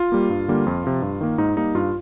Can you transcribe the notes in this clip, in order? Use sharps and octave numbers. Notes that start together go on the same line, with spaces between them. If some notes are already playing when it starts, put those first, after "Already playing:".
Already playing: F4
G3 A#3
G2
D3 G3 A#3
F2
C3 F3
G2
D#3 A#3
G#2 D#4
G3 A#3 D#4
G2 F4